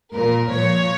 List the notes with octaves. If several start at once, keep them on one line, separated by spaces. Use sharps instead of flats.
A#2 F3 A#4
A#2 F3 C#5